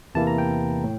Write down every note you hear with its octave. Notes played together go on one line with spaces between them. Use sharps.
E2 C3 E3 A#3 E4 A5
A#5
G5
A2